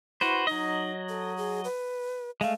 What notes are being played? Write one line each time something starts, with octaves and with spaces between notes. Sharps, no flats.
E4 F#4 B4 C5
F#3 D#4 D#5
A4
G#4
B4
G#3 A3 F5